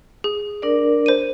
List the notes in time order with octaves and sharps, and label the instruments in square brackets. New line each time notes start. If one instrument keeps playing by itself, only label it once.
[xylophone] G#4
[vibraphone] D4 A#4 D5
[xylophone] C5 D#7